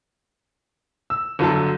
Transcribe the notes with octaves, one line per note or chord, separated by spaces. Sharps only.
E6
G1 D3 F#3 A4